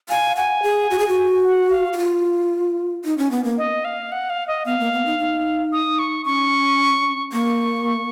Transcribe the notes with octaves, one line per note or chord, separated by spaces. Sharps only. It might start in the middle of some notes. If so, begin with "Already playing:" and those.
F5 G#5
F#5 G#5
G#4
F#4
G#4
F#4
F#5
F5
F#4
F4
D#4
C#4
B3
A#3
D#5
F5
F#5
F5
D#5
B3 F5
A#3
B3
D#4
D#4
D#6
C#6
C#4 C#6
A#3 C#6